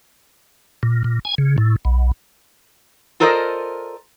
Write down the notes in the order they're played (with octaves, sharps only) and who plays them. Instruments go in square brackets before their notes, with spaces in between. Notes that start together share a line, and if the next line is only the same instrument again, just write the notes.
[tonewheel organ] A#2
A#2
G#5
C#3
A2
B1
[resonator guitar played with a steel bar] F4 A4 A#4 C5 D5 D#5